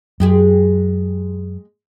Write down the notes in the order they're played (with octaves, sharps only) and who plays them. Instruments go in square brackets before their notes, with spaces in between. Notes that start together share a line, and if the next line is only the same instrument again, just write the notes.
[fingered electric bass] F#2 [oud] G#3 G4 G#4